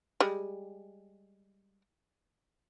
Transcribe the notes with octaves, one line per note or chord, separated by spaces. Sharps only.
G3 G#3